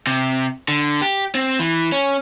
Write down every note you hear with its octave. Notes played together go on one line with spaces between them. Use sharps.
C3
D3
G4
C4
E3
C#4